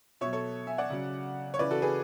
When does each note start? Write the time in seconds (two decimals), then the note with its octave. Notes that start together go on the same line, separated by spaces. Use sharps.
0.21 B2 C#5 E5
0.26 F#3
0.33 A4 C#5
0.67 E5 G#5
0.78 D5 F#5
0.90 C#3 F#3
1.54 C#5
1.59 C#3 E3 B4 D5
1.71 F#4 A4
1.82 G#4 B4